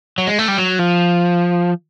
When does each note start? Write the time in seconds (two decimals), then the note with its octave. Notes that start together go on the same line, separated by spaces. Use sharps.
0.18 F#3
0.27 G#3
0.39 A3
0.48 G3
0.58 F#3
0.79 F3